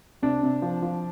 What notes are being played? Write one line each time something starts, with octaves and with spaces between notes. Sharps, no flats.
C3 D4
C3
F3
F3